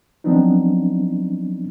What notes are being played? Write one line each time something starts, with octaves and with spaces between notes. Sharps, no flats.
F3 F#3 B3 C4 D4 D#4